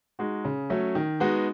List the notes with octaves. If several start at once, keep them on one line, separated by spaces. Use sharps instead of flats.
G#3 D#4 F#4
C#3
F#3 A3 C#4
D#3
G#3 B3 D#4 F#4